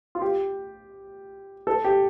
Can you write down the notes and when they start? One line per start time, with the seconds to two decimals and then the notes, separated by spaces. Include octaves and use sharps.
0.15 F4
0.21 G4
1.67 A4
1.84 G4